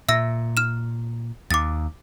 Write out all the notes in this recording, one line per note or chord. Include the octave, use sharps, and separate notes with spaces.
A#2 E5 E6 A#6
F6 E7
D#2 D6 A6